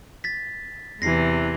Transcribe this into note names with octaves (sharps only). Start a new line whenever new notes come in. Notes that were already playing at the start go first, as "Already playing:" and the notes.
A6 B6
E2 C3 E3 A#6 C7